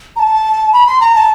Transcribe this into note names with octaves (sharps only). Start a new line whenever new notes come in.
A#5
A5
B5
C6
A#5
A5